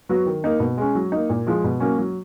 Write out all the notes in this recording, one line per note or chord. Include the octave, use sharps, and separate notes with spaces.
F#3 B3 F#4
D#3
A#3 D#4
B2
G#3 C#4
F#3
A#3 D#4
A#2
F3 G#3
B2
F#3 A#3 C#4
F#3